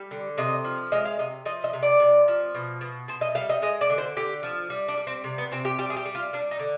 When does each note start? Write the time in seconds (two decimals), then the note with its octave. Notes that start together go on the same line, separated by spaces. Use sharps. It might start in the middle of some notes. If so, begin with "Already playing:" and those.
Already playing: G3
0.11 D3
0.38 C3 D#5
0.64 F3
0.92 G#3 D#5
1.05 F5
1.19 C3 D#5
1.46 F3 D#5
1.64 D#5
1.73 C3
1.83 D5
2.00 C3
2.28 F3
2.55 B2
2.81 B2
3.08 B2 C5
3.21 D#5
3.35 G3 F5
3.50 D#5
3.62 G#3 D#5
3.81 D5
3.90 D3
3.98 C5
4.16 D3 G4
4.43 F3
4.70 G3
4.88 D4
4.97 G3
5.07 C4
5.24 C3
5.38 B3
5.52 C3 C4
5.65 G4
5.78 G3 G4
5.90 G#4
5.97 G4
6.05 G3
6.15 F4
6.33 G3 D4
6.51 D#4
6.59 D3